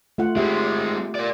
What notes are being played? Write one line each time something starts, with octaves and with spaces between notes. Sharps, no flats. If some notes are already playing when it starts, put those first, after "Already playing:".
A3 F4 F#5
G#3 C4 G4 E5
A#4 D5